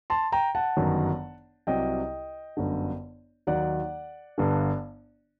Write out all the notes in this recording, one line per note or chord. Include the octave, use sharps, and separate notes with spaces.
A5 C6
G5 A#5
F#5 A5
G1 F#2 D#3 F#3
C2 C3 F#3 D#5 G5
G1 F#2 D3
D#2 D#3 F#3 D5 F#5
G1 G2 D3